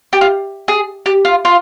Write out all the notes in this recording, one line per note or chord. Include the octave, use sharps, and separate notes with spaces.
G4
F4
G#4
G4
F4
F4